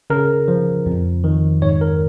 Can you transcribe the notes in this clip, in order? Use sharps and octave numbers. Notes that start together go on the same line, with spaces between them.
C#3 A#4
F3
F2
D#3
G#2 C#5
A#4